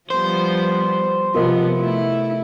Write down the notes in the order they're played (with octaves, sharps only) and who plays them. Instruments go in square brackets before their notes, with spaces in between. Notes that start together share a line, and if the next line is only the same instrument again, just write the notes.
[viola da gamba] F3 G3 B3 [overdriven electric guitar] C5
[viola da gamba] C3 F3 B3 [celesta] F4 A#4 D#5
[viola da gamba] A3 E4